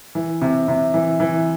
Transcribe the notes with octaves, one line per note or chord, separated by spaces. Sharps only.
E3
C3
C3
E3
E3